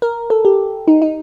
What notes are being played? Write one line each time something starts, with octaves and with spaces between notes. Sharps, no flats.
A#4
A4
G4
D#4
D#4